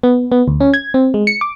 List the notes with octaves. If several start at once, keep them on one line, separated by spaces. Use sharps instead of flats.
B3
B3
D2
C#4
G#6
C4
G#3
C#7
D6